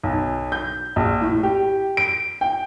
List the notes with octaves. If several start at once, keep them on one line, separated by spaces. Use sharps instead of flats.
B1
G6
A#1
A2
G4
D7
G5